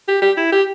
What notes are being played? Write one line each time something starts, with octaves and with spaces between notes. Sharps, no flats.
G4
G4
E4
G4